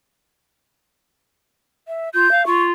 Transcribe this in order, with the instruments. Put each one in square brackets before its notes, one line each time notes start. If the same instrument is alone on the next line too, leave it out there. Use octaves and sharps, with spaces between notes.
[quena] E5
[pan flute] F4 [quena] G6
[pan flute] F5
[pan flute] F4 [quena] C#6